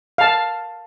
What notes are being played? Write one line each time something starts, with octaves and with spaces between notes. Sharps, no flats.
F5 A5